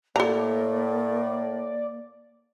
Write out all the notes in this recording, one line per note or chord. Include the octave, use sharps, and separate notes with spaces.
A2 A#3 A4 D5 A#5